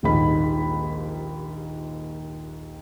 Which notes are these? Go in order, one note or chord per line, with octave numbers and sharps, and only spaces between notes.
D#1 A#1 D#2 G#2 D#4 B5